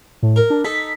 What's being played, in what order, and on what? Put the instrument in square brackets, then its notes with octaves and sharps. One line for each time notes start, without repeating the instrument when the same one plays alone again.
[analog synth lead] A2
[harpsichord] A#4
[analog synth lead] D4
[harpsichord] D#4 A4 [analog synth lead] B6